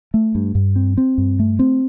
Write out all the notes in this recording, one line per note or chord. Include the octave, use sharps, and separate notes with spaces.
A3
G2
G2
C4
C4
G2
A3
C4